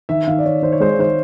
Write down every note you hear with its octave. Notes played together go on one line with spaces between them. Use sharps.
D#3 E5
D#3 F5
D5
D#3 C#5
D#3 C5
C#5
G#3 C5
C#5
D#3 C5